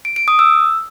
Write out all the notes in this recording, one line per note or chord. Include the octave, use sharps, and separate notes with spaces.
D7
D7
D#6
E6